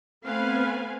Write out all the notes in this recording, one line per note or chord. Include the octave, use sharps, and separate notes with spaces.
A3 B3 C4 B4 F5 G#5